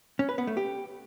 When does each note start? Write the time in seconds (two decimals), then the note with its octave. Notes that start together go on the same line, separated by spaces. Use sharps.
0.19 C#4
0.29 B4
0.38 B3
0.47 A3
0.57 G4